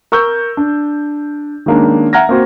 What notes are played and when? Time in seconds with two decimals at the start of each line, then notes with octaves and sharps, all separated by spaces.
0.12 A#4 C#6 E6 G6
0.57 D4
1.66 D#3 G#3 A#3 C#4 D4
2.13 E5 F#5 A#5 F6 G#6 A#6
2.29 A#3 C4 F#4